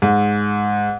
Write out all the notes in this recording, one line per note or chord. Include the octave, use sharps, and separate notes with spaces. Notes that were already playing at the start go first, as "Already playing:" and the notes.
G#2